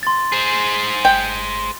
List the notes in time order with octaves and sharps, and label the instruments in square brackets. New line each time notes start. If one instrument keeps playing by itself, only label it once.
[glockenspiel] C6 A6
[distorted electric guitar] G#4 C5
[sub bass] G1 [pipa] G5